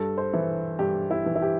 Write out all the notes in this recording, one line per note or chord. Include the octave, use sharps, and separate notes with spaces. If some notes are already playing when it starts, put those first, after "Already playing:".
Already playing: G2 A4
C5
E3
G2 G4
E4
E3
E4
G4